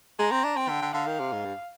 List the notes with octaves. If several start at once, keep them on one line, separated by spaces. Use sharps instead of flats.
G#3 A#5
C4
D4
C4 G5
D3
D3
D3 F5
D#3
C3
G#2
G2